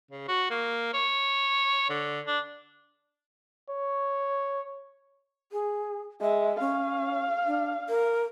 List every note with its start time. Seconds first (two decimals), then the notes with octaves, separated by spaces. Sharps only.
0.11 C#3
0.28 F#4
0.50 A#3
0.94 C#5
1.90 D3
2.27 D4
3.70 C#5
5.52 G#4
6.21 G#3 E5
6.60 C#4 F5
7.46 D4
7.89 A#4